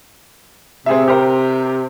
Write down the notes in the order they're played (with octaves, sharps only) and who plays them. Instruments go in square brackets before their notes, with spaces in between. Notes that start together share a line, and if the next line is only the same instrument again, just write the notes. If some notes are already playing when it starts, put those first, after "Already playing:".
[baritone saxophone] C3 [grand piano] C4 G#4 E5
[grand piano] G4 A#4 C5